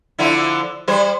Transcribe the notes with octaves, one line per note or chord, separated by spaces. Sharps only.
D3 F3 E4
G3 C5